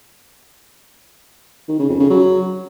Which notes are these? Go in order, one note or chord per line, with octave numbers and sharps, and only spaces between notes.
D#3
C#3
F2
C#3
F#3